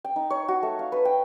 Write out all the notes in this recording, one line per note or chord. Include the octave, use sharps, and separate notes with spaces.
G5
D#4
C#5
F#4
A3
F5
B4
G5